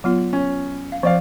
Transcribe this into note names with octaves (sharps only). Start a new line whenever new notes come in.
F#3 B3 F4
C#4
F5
F3 C4 D5 F5